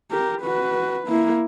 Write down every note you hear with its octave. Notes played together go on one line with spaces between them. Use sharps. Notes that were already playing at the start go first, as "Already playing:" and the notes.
G4 A#4
F#4 B4
A#3 E4